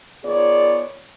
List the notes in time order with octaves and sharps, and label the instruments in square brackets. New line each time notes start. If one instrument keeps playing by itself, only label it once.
[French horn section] D#3 B3 F4 G#4 C#5 D5